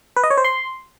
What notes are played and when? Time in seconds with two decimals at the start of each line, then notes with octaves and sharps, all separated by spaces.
0.17 B4
0.24 D#5
0.31 C#5
0.38 C5
0.45 C6